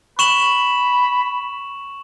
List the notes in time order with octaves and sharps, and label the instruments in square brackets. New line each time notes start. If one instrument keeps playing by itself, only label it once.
[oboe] B5 [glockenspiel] C#6 E7 F#7